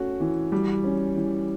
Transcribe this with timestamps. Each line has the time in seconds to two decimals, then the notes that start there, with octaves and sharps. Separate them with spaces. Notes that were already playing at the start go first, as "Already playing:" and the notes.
Already playing: A3 C#4 F#4
0.20 E3
0.52 G3
0.84 C#4
1.17 E3